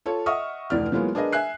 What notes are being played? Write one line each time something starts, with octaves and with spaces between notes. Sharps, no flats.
F4 A4 C#5
D#5 E5 F#5 C#6 D#6 F6
F1 D2 E3 D5 F6
E3 F#3 G#3 A#3 B3 F4
D4 G#4 A#4 B4 D#5
E5 G#5 F#6 C7